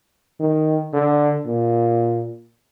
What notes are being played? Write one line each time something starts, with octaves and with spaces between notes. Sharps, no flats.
D#3
D3
A#2